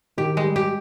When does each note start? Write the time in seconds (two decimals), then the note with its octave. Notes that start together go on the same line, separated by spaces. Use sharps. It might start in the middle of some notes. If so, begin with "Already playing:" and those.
0.17 D#3 G4
0.37 G#3
0.43 G3
0.56 G4